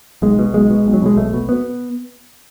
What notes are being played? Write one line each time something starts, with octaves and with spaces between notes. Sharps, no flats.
B1 G#3
B2
B1 G#3
B2
B1
F#3
B2 G#3
B1 A3
B2
B3